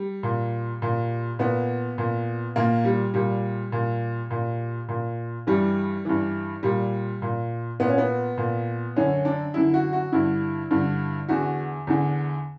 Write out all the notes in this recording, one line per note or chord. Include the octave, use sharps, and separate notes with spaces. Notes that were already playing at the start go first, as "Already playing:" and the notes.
Already playing: G3
A#2
A#2
A#2 B3
A#2
A#2 A#3
G3
A#2 G3
A#2
A#2
A#2
G2 E3 G3
G2 E3
A#2 G3
A#2
A#2 B3
C#4
B3
A#2
F#2 D3 C#4
D4
F#2 D3 E4
F#4
F#4
G2 D3 E4
G2 D3
E2 D3 F#4
E2 D3